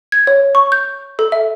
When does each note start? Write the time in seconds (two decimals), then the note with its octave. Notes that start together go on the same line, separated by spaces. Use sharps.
0.12 G#6
0.27 C#5
0.55 C#6
0.72 G6
1.19 A4
1.32 E5